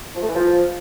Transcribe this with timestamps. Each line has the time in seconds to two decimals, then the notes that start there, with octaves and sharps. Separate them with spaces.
0.15 F3
0.22 A3
0.28 E3
0.35 F3